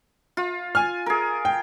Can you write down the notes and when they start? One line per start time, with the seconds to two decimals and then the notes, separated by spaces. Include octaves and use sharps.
0.37 F4
0.75 G#5 F6
1.06 G#4 A#4
1.45 G5